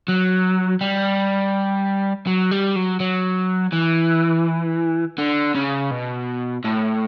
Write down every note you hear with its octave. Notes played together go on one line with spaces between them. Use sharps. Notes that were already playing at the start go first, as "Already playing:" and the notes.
F#3
G3
F#3
G3
F#3
F#3
E3
D3
C#3
B2
A2